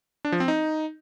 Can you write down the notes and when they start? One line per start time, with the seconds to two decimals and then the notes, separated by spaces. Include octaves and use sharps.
0.25 D4
0.32 F3
0.40 C4
0.48 D#4